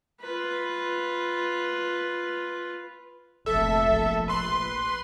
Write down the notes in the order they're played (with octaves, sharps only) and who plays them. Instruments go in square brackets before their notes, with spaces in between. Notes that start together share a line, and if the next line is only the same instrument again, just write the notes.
[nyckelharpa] F4 B4
[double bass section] F1 A#1 [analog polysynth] A4 E5
[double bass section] A#1
[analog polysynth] B4 C6